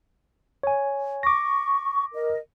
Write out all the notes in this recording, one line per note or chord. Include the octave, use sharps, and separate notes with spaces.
C#5 G#5
C#6 D6 A#6
A#4 D#5